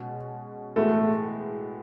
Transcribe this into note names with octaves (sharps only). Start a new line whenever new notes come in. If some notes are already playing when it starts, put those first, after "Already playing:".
Already playing: B2 G#3 C#4 F#4
A2 E3 G#3 A3 B3 F#4